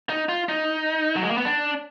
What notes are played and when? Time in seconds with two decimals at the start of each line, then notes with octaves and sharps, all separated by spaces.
0.09 D#4
0.29 F4
0.49 D#4
1.16 F#3
1.22 G#3
1.31 A#3
1.38 B3
1.45 D4